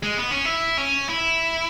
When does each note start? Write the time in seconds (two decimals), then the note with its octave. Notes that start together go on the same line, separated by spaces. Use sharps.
0.03 G#3
0.17 B3
0.31 C#4
0.45 E4
0.78 C#4
1.09 E4